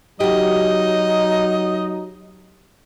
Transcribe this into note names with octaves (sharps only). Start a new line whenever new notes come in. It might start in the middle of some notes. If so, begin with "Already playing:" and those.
F#3 D#4 F#4 G4 D#5